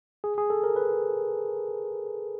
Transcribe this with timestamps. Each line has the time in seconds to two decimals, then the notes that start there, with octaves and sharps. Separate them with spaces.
0.24 G#4
0.38 G#4
0.50 A4
0.64 A#4
0.76 B4